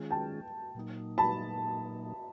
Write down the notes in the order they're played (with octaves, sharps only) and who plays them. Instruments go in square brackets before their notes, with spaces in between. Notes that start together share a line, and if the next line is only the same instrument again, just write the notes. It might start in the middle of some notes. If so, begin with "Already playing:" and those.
Already playing: [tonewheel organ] D#3 G#3 C#4 F4 G#4
[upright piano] G5 A5
[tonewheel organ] A#2 F#3 A#3 D#4
[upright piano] A5 B5